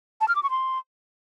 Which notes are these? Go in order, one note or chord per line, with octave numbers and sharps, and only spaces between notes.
A5
F6
D6
C#6
C6